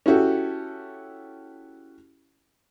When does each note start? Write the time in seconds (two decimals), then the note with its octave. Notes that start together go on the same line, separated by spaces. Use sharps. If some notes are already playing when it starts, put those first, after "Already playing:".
0.06 C#4 E4 F#4 G4 A4